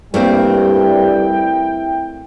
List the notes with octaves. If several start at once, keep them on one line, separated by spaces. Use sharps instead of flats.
G2 G3 A3 A#3 C4 E4 G5